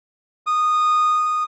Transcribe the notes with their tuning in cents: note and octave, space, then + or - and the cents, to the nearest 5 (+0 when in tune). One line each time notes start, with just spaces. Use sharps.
D#6 -15